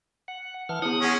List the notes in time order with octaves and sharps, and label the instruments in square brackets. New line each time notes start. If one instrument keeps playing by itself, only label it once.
[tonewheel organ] F#5
[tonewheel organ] E3 F6 [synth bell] F#5 A5
[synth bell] B3 E4 [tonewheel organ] F#5 D#6
[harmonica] G#3 C#4